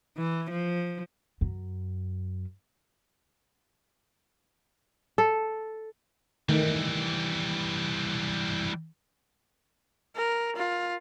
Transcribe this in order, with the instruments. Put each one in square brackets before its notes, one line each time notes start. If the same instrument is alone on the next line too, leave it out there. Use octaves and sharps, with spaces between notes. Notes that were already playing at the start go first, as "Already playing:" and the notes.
[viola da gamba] E3
F3
[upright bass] F#2
[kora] A4
[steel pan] D#3 A3 [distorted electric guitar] E3 G3
[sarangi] A#4
F4